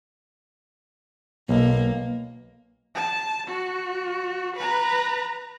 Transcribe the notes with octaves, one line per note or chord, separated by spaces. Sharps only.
B1 A#3
A5
F#4
B4 A#5